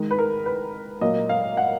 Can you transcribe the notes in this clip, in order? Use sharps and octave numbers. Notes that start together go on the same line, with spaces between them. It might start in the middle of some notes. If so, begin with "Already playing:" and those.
Already playing: D#3 G#3
B4
A#4
B4
A#2 F#3 A#3 D#5
F5
F#5